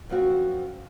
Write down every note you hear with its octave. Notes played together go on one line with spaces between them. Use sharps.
F#2 F3 C4 F#4